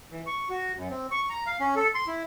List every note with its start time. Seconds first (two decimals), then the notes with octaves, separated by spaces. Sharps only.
0.11 E3
0.26 C#6
0.50 F#4
0.77 F#2
0.90 C4
1.11 C#6
1.30 A#5
1.46 F5
1.60 C#4
1.76 A4
1.95 C6
2.07 E4